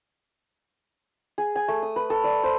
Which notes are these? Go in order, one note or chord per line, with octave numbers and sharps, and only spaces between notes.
G#4
G#5
A3
D#6
B4
A4
D5
C5